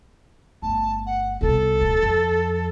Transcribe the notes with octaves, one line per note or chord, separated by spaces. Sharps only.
G1 A3 A5
F#5
C2 B2 A4
D1
F2